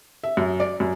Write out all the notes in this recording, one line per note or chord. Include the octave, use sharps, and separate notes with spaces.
E5
F#2
D5
F#2